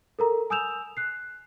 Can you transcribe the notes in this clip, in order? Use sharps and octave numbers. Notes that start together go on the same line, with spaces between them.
A4 A#4 A#5
G#5 D#6 E6 G6 E7 F7
F#6 C7